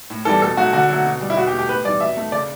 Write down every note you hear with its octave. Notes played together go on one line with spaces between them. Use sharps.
A2
E3 G3 A4
B2 A4
F#3 A3 F#4
D3 F#4
F#3 A3
B2
G3
E4
B2 F#4
G4
A3
G4
A2 B4
E3 G3 D5
B2 E5
A3
C#3 D5